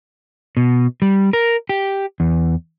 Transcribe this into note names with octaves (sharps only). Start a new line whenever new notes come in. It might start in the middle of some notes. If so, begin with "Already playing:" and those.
B2
G3
A#4
G4
E2